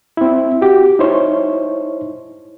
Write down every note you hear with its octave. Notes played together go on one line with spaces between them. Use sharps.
C4 E4
F#4 G4
D#4 E4 C5 C#5